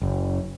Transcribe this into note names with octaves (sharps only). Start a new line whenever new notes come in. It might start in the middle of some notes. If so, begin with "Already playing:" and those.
F#1